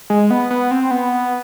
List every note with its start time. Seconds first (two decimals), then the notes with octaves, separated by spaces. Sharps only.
0.10 G#3
0.30 B3
0.50 B3
0.71 C4
0.91 B3